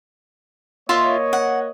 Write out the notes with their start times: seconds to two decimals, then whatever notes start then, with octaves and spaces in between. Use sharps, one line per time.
0.89 A#3 F4 C#5 D#5 E5 C6
1.33 F#5